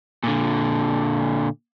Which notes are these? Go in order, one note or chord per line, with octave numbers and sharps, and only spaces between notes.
A#2 D3